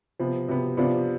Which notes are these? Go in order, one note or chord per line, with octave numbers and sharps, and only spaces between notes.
C3 F3 B3
C3 F3 B3
C3 F3 B3 D4 F4